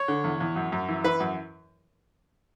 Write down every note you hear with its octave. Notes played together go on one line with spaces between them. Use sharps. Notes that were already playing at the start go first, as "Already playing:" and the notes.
Already playing: C#5
D3
E2
E2
F#2
F#2
E3
E3 B4
F#2